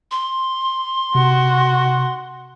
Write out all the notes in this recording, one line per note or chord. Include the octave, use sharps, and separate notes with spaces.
C6
C3 F#4